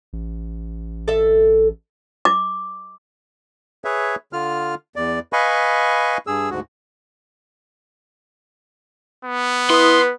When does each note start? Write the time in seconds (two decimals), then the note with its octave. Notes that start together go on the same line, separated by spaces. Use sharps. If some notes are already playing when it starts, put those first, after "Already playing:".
0.13 A1
1.08 A4 E5
2.25 D6
3.85 G#4 B4 C#5 E5
4.33 D3 F4 F6
4.96 E2 D5
5.33 B4 D#5 F5 G#5 B5 C#6
6.27 G2 G#4 E6
6.50 D2 G#2 F#4
9.25 B3
9.70 E4 B4 C6 D#6